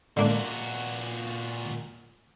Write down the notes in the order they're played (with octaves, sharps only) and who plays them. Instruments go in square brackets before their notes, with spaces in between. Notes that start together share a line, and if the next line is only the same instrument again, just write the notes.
[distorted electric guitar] A#2 F#4 [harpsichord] D3 A#3 D4